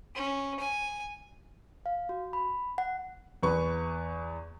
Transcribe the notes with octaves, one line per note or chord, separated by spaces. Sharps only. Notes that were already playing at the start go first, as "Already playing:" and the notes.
C#4
G#5
F5
F#4
B5
F#5
E2 B3 B4 C#6